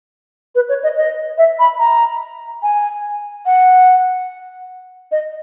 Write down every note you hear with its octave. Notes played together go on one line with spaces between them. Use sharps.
B4
C#5
D#5
D#5
E5
B5
A#5
G#5
F#5
D#5